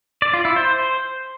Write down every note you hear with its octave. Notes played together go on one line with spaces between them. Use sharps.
D5
F4
E4
C5